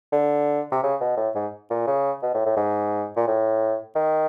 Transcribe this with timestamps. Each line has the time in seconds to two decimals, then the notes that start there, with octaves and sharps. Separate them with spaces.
0.13 D3
0.72 C3
0.83 C#3
1.01 B2
1.17 A2
1.35 G#2
1.70 A#2
1.87 C#3
2.23 B2
2.34 A2
2.46 A2
2.57 G#2
3.16 A#2
3.27 A2
3.96 D#3